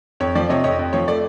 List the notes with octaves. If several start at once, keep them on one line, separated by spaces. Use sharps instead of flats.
F2 C#5
F3 D5
C3 C#5 D#5
F2 C#5 D#5
F2
F3 C#5
A3 D5